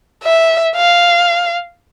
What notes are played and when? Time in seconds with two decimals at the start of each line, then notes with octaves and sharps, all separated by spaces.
0.24 E5
0.76 F5